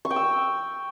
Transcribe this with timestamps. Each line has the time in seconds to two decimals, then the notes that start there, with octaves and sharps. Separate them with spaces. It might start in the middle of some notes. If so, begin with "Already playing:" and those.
0.05 C#6
0.10 G5
0.16 E6